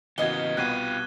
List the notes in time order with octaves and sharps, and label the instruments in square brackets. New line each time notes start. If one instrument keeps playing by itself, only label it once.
[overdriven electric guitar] C#3 B3 [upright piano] E3 F#4 [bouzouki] A#3 D#5 [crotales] G#6 G7
[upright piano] C2 B2 B3 [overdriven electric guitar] F4 G4 [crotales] F#6 G#6 D#7